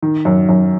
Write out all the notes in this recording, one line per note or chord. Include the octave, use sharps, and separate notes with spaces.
D#3
F#2
F#2